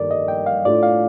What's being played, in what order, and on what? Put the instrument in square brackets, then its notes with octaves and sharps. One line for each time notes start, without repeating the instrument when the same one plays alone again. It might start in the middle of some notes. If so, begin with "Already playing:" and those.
Already playing: [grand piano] G2 D#3 A#3 [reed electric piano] A4 A#4 D5
[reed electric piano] D#5
G5
F5
[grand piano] A2 A3 D4 F4 [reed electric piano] D5
[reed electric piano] F5